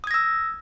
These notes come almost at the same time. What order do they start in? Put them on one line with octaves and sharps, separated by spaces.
D#6 G#6 A#6 E6